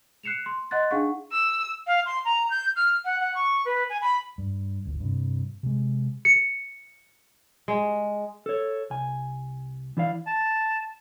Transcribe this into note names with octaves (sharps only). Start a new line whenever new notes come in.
F#6 C7 C#7 E7 F7
C6
D#5 F#5 C6 F#6 A6
D4 D#4 G#4 F5 F#5 C#6
E6
F5
C6
A#5
G6
F6
F#5
F#5
C#6
B4
G#5
B5
G2
D1 G1
G2 C3
C3 G#3
C#7
G#3
A4 C#5
C2 G#5
E3 E4 D5 F5
A5